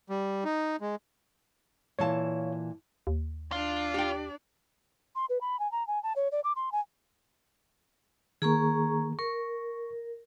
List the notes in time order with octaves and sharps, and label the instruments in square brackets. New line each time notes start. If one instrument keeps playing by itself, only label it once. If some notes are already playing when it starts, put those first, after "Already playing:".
[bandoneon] G3
D#4
G#3
[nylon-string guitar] A#2 E3 A5 [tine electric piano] C#5 F5
[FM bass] D#2
[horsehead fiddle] D4 D5 [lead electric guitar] F4
[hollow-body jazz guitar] G4 G5
[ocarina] C6
B4
B5
G#5
A#5
G#5
A5
C#5
D5
D6
C6
G#5
[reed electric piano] D#3 A#3 [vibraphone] G#4 A#5 C#6
[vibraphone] A#4 [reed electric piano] C#6